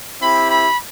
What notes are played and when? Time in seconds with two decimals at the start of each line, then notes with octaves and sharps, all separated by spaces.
0.21 C4 E4 G4 B5
0.51 B5